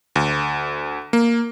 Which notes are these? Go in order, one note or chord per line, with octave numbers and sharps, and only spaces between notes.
D2
A#3